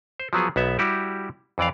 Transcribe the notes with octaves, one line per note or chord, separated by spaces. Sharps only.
C5
F3 F#3 B3 G#4
B1 B3 E5
G3 E4 F#4 G4
F2 E3 D5 F5